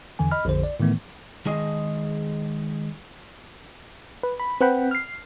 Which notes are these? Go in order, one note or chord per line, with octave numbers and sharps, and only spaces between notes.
E2 D3 E3 G#5
D#5 B5 F6
A#1 F2 D3 C5
D5
A2 D#3 E3 A3 B3
D#3 G#3 G#4 D#5
B4
B5
C4 B4 F#5 G5 B5
F6 C7